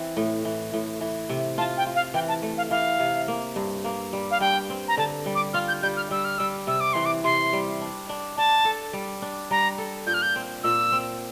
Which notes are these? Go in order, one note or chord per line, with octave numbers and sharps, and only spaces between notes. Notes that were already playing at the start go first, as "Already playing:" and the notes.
Already playing: E3 C4
A2
E3
A2
E3
C3
F4 A5
G5
F4
F5
E3 G5
A5
A3
F5
E3 F5
C3
A#3
G2
A#3
G3
F5
G2 G5
C4
A#5
D3 A5
G3
D6
F4 F6
G6
G3 G6
F6
G3 E6
F6
G3 E6
C3 E6
D6
E3 C6
D6
C3 C6
G3
D4
D4
D4 A5
A4
G3
D4
G3 A#5
A4
A#2 G6
F6
G6
C4
A#2 E6
C4